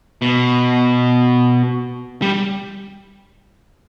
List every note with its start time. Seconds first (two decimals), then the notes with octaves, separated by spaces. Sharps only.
0.22 B2
2.22 G3